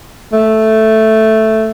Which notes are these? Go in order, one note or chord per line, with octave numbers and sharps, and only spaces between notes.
A3